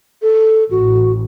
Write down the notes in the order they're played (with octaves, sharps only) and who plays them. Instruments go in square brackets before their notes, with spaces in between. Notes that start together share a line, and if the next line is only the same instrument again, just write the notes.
[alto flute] A4
[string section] A1 [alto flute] F#4